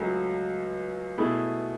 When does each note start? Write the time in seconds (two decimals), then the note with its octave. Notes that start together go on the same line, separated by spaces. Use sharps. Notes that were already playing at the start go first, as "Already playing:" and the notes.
Already playing: C#2 C#3 F#3 A3
1.18 B2 A3 E4 G#4